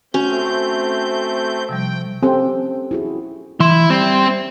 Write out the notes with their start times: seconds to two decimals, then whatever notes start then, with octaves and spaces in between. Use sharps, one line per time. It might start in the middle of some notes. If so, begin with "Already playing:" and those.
0.14 A3 C4 C#4 F#4 G6
1.69 C3 F3 G3 G5
2.23 C4 C#4 G4 A4
2.91 E4 F#4 G#4
3.60 E3 E4 C6
3.90 G3 C4